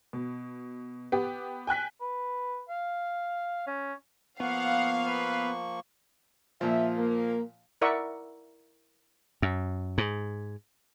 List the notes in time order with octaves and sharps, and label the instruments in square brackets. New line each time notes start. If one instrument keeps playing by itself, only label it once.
[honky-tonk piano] B2
B3 G4
G5 G#5 F#6 B6
[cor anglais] B4
F5
C#4
[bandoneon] F3 A#3 C#6 [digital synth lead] B3 [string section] F5 [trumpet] F#5
[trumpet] B4
[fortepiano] A#2 F3 [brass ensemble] E5
[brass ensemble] A#3
[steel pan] E4 A#4 D5 E5 F#5 C#6
[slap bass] F#2
G#2